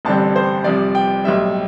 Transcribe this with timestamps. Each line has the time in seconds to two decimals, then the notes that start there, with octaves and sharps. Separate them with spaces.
0.05 A1 G2 D3 G3 C4 A5
0.36 C5
0.64 C2 C3 F3 D5
0.95 G5
1.24 B1 A2 G3 E5